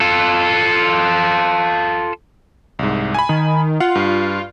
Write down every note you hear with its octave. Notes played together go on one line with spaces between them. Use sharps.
F4 A4
C2 G#2
G#5 B5
D#3
F4 F#5
G2